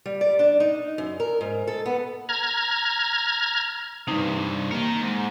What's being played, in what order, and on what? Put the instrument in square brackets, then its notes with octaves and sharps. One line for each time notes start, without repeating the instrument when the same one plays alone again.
[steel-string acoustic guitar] G3
D5
D4
D#4
F#2
A#4
G#2
A4
B3
[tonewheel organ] A#5 F6 G#6
[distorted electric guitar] G2 C3 [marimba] D#4
[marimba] A#3 [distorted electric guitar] D#4 A#4
[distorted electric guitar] G#2